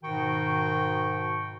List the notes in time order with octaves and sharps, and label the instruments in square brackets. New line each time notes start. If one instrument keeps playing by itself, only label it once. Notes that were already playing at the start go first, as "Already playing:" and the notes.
[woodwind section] G#2 B2 D#3 F#4 G5 C#6